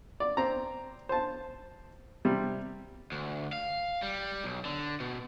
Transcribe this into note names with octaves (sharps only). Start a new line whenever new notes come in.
D5
C4 A#5
C5 A5
C3 G3
D2
F5
G3
B1
D3
B2